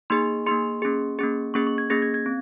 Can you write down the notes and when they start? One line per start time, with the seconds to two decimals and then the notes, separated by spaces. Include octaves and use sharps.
0.10 A#3 D#4 G#4 C6
0.46 A#3 D#4 G#4 C6
0.82 A#3 C#4 G#4
1.19 A#3 C#4 G#4
1.54 A#3 C#4 G#4 C#6
1.67 C#6
1.78 G#6
1.90 A#3 C#4 G#4 A#6
2.02 G#6
2.14 G#6
2.26 C4